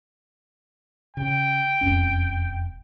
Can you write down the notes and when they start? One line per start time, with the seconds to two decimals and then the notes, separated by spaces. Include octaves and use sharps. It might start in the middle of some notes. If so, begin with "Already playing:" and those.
1.17 C#3 G5
1.81 E1 F2 C#4